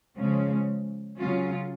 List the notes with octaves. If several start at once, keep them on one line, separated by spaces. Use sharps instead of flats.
C#3 F3 G#3 C#4
C#3 F#3 C#4 F4